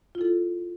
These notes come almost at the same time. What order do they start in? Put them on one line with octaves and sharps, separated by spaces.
F4 E4 A4